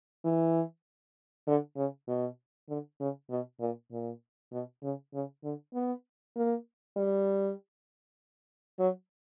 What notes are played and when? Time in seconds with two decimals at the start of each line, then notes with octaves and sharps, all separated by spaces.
0.25 E3
1.47 D3
1.77 C#3
2.08 B2
2.69 D3
3.00 C#3
3.30 B2
3.60 A#2
3.91 A#2
4.52 B2
4.83 C#3
5.14 C#3
5.44 D3
5.74 B3
6.36 A#3
6.97 G3
8.79 F#3